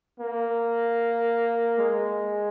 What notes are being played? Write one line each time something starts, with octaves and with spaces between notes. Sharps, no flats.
A#3
G#3